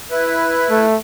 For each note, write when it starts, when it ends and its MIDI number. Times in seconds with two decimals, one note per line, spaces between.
0.11 0.86 64
0.11 0.86 71
0.70 0.96 57